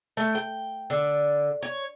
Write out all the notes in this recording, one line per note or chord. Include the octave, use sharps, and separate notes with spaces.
A3
G5
D3
C#5